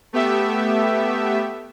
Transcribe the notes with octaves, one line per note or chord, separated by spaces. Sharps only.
A3 B3 G4 E5